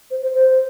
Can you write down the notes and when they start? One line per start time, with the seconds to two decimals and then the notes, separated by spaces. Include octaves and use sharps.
0.11 C5
0.22 C5
0.34 C5